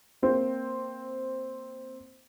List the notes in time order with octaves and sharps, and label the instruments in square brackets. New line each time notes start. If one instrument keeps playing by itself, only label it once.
[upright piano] A#3 C4